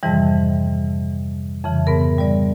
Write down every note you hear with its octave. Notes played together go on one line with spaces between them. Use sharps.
F2 G#2 C3 D#3 E3 G3
F2 C#3 E3
G#2 B3 A#4
G3 D5